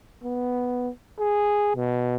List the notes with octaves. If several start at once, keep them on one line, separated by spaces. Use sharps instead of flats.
B3
G#4
B2